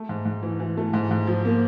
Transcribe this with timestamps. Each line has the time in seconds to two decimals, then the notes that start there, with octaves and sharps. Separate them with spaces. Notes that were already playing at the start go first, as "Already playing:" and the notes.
Already playing: A3
0.09 G#2
0.25 G#2
0.43 E3
0.60 E3
0.77 A3
0.93 G#2
1.11 G#2
1.27 F3
1.45 A#3